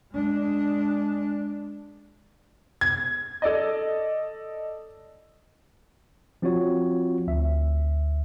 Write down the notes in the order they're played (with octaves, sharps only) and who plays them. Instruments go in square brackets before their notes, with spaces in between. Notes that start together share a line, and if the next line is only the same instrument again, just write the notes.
[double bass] G#3 D4
[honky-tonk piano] G#6
[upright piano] A4 D5 D#5
[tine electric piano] F3 C4 F4 F#4 C#5
D2 E5